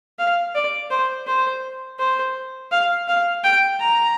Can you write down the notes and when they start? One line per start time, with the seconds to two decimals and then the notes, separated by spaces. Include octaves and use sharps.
0.19 F5
0.55 D5
0.90 C5
1.27 C5
1.99 C5
2.72 F5
3.08 F5
3.44 G5
3.80 A#5